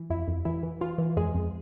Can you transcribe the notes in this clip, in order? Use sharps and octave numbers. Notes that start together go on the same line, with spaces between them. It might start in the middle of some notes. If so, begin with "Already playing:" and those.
Already playing: E3
F2 E4
F2
E3 E4
E3
E3 F4
E3
F2 G#3 G#4
F2